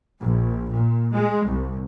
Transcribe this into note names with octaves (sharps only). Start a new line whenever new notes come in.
A#1
A#2
G#3
C2